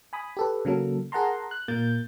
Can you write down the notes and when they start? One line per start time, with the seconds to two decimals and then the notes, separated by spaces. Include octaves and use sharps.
0.13 G#5 B5 D#6
0.37 G4 A4 B4
0.65 C#3 F#3 A#3 A4
1.12 G#4 A#4 F#5 A5 A#5 C6
1.51 F#6
1.68 A#2 A#3 G6 A6